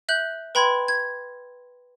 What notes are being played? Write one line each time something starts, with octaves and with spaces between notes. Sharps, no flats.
E5 F#6 G6 F#7
B4 G5 B5 C6 G#6
G#6